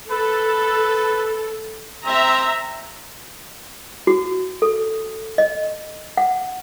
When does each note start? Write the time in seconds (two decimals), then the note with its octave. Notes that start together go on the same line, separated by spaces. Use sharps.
0.11 A4 B4
2.06 C4 E5 A#5
4.07 F#4
4.62 A4
5.38 D#5
6.17 F#5